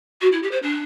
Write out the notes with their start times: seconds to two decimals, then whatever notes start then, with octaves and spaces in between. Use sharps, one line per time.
0.21 F#4
0.32 E4
0.43 G4
0.51 C5
0.63 D4